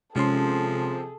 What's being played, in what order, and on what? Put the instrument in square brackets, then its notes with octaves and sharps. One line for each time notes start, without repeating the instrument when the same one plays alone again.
[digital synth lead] C3 [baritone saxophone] F3 [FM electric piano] G#3 C#4 C6 [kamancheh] G#4 A4